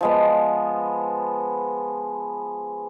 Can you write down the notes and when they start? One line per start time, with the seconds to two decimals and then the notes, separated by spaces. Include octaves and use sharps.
0.01 F3 G#3 B3